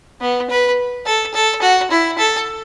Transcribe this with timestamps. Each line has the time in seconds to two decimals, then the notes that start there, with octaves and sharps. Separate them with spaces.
0.21 B3
0.50 B4
1.06 A4
1.34 A4
1.62 F#4
1.91 E4
2.18 A4